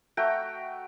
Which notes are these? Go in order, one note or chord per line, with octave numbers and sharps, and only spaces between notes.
A3 F#4 G5 A#5